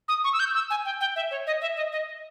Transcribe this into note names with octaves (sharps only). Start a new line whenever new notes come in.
D#6
C#6
E6
G6
E6
G#5
G5
G5
E5
C#5
D#5
E5
D#5
D#5